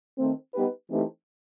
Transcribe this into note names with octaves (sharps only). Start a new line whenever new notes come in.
D#3 A3 C4
G3 B3 D#4 G4 B4
E3 A3 C4 D#4 G4